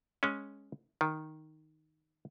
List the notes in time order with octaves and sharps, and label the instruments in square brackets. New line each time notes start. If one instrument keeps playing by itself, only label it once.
[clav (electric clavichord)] G#3 C#4
D#3